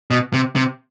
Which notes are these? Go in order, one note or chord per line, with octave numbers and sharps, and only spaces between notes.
B2
C3
C3